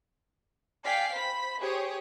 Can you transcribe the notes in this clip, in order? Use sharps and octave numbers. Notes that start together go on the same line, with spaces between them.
D5 F5 G5 G#5 B6 C7
C5 B5 B6
G4 G#4 C5 C#5 D#6